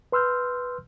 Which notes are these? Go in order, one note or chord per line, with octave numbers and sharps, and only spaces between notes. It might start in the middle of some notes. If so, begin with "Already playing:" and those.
B4 C6 E6 F6 G6